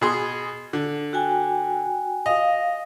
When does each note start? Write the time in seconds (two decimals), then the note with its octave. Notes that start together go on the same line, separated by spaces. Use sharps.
0.01 B2 G#4 C6
0.73 D3
1.13 F#4 G5 G#5
2.26 D#5 F5